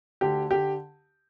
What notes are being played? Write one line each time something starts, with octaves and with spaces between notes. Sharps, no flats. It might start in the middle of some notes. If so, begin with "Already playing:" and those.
D2 D3 G4
D3 G4